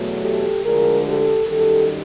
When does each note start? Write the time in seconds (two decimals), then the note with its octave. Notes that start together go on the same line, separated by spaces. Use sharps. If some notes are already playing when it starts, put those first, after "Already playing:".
Already playing: E2 B2 F#3 A3
0.21 G4 A4
0.63 D2 D3 F3 G#3 G#4 A#4
1.05 G4 A4
1.47 F#2 D#3 G3 G4 A4